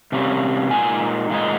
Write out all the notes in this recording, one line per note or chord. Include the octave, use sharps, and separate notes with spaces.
C3 G3 A#3 C#4
A#2 G#3 D#4 G#5
A#2 G#3 D#4